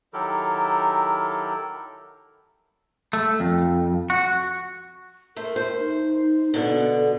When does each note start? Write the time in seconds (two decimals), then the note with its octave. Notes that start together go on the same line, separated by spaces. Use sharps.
0.13 D#3 F#3 E4 G4 A4 A#4
3.13 A3
3.40 F2
4.10 F#4
5.36 A3 A#4 C5
5.56 C5
5.79 D#4
6.54 B2 D3 A4